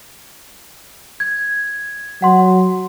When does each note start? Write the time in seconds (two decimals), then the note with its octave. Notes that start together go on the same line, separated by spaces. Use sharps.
1.20 G#6
2.22 F#3 F#5 C6